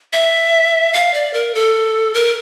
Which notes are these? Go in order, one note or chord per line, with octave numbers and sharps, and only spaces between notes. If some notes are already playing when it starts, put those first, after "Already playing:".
E5
F5
D5
A#4
A4
A#4